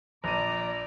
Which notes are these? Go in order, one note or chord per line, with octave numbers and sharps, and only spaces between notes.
A#1 D5 A#5 D#7